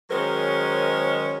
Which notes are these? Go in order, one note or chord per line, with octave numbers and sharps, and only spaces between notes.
D#3 F#3 G#3 C#4 A#4 C5